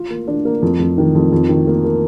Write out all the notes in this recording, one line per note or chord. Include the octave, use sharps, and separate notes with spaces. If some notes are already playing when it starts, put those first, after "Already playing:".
Already playing: F4
A#3
D4
A#3
F2
F2
D#3
F2
F2
D#3
A#3
A#3